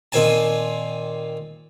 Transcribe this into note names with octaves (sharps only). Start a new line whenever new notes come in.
A#2 D#3 C4 G#5 A5